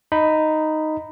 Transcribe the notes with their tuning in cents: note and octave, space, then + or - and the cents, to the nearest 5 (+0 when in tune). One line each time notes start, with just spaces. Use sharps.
D#4 +0 B5 +5